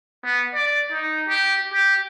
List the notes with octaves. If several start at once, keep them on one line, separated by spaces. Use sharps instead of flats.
B3
D5
D#4
G4
G4